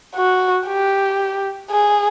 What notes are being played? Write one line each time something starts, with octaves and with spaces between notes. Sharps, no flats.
F#4
G4
G#4